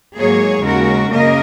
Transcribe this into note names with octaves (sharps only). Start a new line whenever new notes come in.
G#2 F#3 A#3 G#4 C#5
D#2 C#3 G#3 F#4 A#4
F#2 C#3 A#3 A#4 D#5